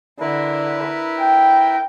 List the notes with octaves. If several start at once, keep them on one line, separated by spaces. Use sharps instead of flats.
D3 E4 A#4 B4
G5